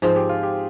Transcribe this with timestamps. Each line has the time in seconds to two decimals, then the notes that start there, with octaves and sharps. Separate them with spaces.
0.02 G#2 F3 C4 G#4
0.16 G4
0.29 F4
0.43 G4